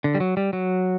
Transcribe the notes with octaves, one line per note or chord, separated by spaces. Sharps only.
D3
G3
F#3
G3
F#3